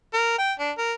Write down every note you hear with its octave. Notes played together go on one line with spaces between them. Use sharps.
A#4
G5
D4
A#4